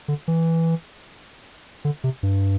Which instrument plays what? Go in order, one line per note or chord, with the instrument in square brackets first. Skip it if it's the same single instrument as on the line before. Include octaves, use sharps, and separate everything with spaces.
[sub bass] D3
E3
D3
C3
G2